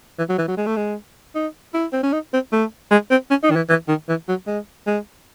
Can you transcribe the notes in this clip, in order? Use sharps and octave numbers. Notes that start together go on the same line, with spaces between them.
E3
F#3
E3
F#3
G#3
A3
G#3
D#4
E4
C4
C#4
D#4
C4
A3
G#3
C4
C#4
D#4
D#3
E3
E3
D#3
E3
F#3
G#3
G#3